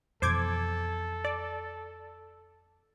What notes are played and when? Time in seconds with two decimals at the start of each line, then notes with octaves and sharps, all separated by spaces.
0.22 F2 B2 E3 A4 C5 D6 G#6
1.25 D5